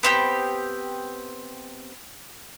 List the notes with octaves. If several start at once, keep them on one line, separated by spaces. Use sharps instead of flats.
B3 C4 G4